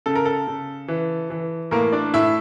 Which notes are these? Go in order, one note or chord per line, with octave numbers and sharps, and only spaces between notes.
C#3 A4
A#4
A4
C#3
E3
E3
A2 A#3 A#4
D4 D5
A2 E4 E5